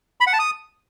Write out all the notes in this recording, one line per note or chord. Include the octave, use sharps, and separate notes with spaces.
B5
F#5
A5
D#6